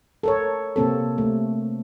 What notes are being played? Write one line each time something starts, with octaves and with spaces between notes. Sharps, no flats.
A4 A#4 C#5
C3 A#3 C4 A4
A3